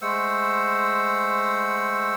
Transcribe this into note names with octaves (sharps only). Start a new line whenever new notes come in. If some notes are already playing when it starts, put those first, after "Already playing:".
G#3 A3 C5 F#5 E6